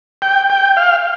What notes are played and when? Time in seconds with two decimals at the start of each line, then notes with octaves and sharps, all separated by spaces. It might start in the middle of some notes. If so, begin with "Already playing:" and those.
0.22 G5
0.50 G5
0.77 F5